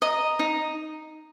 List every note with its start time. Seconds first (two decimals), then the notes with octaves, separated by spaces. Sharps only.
0.02 D#5 A#5
0.39 D#4